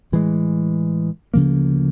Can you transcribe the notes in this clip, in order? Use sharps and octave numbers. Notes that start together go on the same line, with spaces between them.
A2 E3 G#3
D2 C#3 F3 A#3